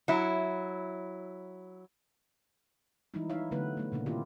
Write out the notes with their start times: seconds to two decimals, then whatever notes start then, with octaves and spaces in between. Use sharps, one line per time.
0.08 F#3 E4
3.14 E3 F3 G3 G#3 D#4 E4
3.30 D#4 E4 C#5 E5 F5
3.51 D3 F#3 A3 B3 B4
3.77 A3 B3
3.92 A#2 C#3 A#3 D4
4.06 D#3 B3 C4 E4 F4 G4